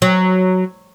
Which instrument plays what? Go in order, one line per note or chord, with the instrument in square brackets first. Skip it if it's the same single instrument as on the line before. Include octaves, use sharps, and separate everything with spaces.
[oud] F#3